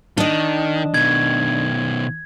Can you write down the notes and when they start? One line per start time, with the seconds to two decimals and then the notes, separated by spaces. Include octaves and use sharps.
0.18 D#3 D4 D#5
0.94 B2 D#3 G#6